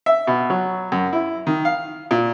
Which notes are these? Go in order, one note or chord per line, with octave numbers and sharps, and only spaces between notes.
E5
B2
F#3
F#2
E4
D#3
F5
A#2